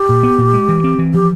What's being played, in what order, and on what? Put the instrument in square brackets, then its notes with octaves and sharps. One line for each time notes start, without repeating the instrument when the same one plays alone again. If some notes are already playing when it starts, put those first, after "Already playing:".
Already playing: [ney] G4
[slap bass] A#2
B3
A#2
G#3
E3
C4
E3
[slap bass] F3 [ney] G4